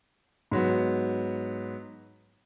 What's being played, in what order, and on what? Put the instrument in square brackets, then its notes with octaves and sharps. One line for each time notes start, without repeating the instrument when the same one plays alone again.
[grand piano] G#2 F#3 B3